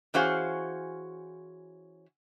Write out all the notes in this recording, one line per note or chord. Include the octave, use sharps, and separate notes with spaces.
E3 C#4 F#4 G#4 C5 F5